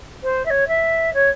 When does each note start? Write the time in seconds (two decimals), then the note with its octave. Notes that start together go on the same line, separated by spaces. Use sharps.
0.23 C5
0.46 E5
0.50 C#5
0.68 E5
1.14 C#5